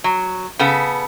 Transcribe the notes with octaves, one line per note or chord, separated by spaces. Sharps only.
F#3
C#3 B3 A4